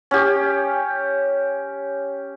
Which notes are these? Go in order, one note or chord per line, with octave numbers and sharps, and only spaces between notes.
C#4 G4